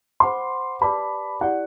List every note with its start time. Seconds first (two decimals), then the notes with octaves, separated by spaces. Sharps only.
0.20 C5 F#5 B5 C6 D6
0.81 G4 B4 D5 A5 B5 D6
1.41 E4 G4 D5 F#5